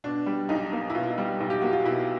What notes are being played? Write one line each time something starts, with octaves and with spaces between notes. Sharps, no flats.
B2 D4
G3
B1 D#4
A#3
E4
B2 F4
G3
B1
G4
A#3 F#4
F4
B2 E4